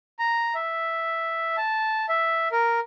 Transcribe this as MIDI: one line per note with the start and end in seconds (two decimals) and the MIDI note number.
0.19 0.54 82
0.55 1.56 76
1.57 2.06 81
2.09 2.48 76
2.52 2.80 70